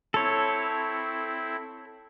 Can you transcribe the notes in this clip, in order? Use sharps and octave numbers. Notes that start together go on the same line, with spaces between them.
C4 E4 A4 C#5